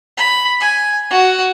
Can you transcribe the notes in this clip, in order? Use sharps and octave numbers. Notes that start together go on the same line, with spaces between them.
B5
G#5
F#4